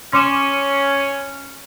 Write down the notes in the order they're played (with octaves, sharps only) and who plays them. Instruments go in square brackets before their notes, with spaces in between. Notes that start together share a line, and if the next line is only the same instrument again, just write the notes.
[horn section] C#4 [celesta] C6 D6 E7